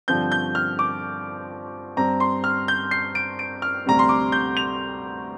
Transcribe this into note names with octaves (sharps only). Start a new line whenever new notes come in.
G2 D3 F3 C4 G6
G6
F6
D6
G2 G3 C4 A#5
C6
F6
G6
C7
D7
D7
F6
D2 C3 G3 C4 A#5
C6
D6
G6
F7